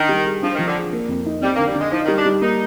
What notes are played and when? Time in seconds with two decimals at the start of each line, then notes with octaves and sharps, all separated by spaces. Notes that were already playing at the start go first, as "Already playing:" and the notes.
Already playing: D#3 D4
0.09 G3
0.25 G#4
0.42 F3 D4
0.55 D#3
0.59 F3
0.67 D3
0.75 G#4
0.93 A#3
1.08 F2
1.26 D#4
1.42 G3 C4
1.55 D3 A#3
1.67 G3
1.75 D3 G#3
1.92 F3 D#4
2.04 D#3
2.08 G3
2.18 D4
2.26 G3
2.41 A#3 D#4